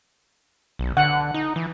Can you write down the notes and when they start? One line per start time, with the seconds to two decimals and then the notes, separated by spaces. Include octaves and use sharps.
0.79 B1
0.97 D3 F#5
1.34 D#4
1.56 E3